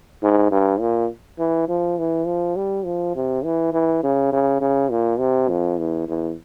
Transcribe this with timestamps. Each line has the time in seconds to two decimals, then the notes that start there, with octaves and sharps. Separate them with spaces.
0.23 G#2
0.51 G2
0.80 A#2
1.39 E3
1.69 F3
1.98 E3
2.26 F3
2.56 G3
2.85 F3
3.15 C3
3.45 E3
3.73 E3
4.03 C#3
4.32 C#3
4.61 C#3
4.90 A#2
5.19 C3
5.49 F2
5.78 E2
6.08 E2